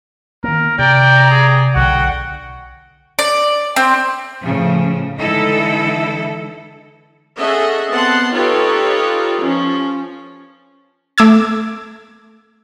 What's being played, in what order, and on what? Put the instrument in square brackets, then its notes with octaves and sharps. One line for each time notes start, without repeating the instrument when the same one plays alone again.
[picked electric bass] D#3 A#3 [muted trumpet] A#4
[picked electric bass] C3 [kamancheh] D5 A#5 [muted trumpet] G5
[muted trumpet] G#4
[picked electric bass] B1 D3 [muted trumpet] F#4 [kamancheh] F#5 G5
[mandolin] D5
C4
[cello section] A2 C#3 F3
D3 E3 G#3 D#4 E4 A4
[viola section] C#4 G#4 A4 D#5 E5 F#5
B3 C4 F#5 A5 C6
D#4 F4 G4 A4 B4 C#5
F3 C#4
[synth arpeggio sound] A3 D6 E6 G#6